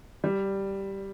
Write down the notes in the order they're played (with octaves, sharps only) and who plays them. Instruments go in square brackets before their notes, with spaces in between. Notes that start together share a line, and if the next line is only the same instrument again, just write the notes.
[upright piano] G3